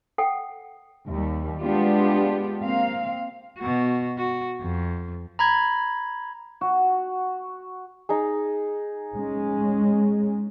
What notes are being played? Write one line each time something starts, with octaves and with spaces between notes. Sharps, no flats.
A4 F#5 G5
D#2 G3
G#3 B3 D4 F4 G4
A#3 C4 F5
B2 F#4
F#4
F2
A#5 B5 G#6
F#4
D#4 G#4
G#3 C#4